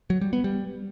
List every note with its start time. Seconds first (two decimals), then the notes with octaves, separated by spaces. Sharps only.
0.10 F#3
0.21 G3
0.33 B3
0.44 G3